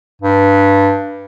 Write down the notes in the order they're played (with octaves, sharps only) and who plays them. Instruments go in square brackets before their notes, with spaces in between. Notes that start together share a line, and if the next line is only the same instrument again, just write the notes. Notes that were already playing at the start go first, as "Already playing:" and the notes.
[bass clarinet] G2